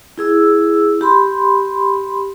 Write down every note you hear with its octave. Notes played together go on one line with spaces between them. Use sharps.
E4 G#4 E6
G4 B5 C6